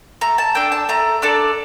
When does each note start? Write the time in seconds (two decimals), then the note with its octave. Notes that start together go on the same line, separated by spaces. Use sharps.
0.21 A3 A#5
0.38 A5
0.55 D4 A4 G5
0.72 A5
0.89 A3 A#5
1.22 D4 A4 D5